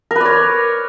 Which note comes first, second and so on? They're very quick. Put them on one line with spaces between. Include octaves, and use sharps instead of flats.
A#4 B4 D5 C#5